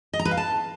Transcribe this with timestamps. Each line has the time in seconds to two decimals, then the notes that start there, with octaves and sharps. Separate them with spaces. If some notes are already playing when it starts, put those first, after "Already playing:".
0.13 D#5
0.19 A#5
0.25 B4
0.31 F5
0.37 A5